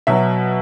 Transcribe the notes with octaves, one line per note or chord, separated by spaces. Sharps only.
B2 F#3 E5